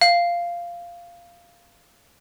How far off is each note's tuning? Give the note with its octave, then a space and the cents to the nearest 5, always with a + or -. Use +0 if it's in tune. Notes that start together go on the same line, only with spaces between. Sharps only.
F5 -10